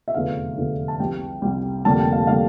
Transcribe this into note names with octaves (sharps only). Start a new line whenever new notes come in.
E5
F1 E2 D3 F3 F5
F1 E2 D3 F3
A5
C2 C3 G3 G5
C2 C3 G3
F1 F2 D3 G3 A#3 A5
G5
F5
D3 G3 A#3 F5